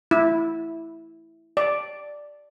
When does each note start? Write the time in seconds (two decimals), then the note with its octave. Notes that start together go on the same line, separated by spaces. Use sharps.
0.11 E4
1.57 D5